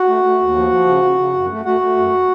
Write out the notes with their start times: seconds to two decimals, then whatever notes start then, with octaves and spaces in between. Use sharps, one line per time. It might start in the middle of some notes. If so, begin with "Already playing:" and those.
Already playing: F#4 F#5
0.08 A3
0.24 A3
0.40 D#2
0.55 F3
0.71 F3
0.86 C#3
1.02 C#3
1.18 C#3
1.34 F#2
1.50 A3
1.65 A3 F#4 F#5
1.81 A3
1.97 F#2